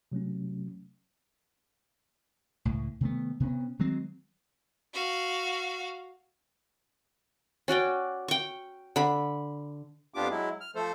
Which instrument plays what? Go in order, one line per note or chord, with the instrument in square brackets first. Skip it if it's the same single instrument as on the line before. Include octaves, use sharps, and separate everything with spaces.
[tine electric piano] C3 F#3 A3 C#4
[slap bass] C#2 A2
C3 D#3 A3 B3
C3 B3 C#4
D#3 F#3 G#3 C4
[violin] F#4 F5
[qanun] C#4 F#4 D5 G5
G5 C#6
D3 B5
[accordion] F2 B3 D4 F4 G4 D6
F#3 G#3 E4
F6
F3 A3 A4 C5